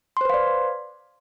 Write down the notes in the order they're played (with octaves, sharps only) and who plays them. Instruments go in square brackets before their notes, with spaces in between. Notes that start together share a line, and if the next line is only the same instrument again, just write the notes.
[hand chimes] C6
C5
B4
F5
D5